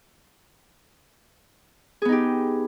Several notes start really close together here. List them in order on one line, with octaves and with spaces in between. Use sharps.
G#4 B3 D#4 G4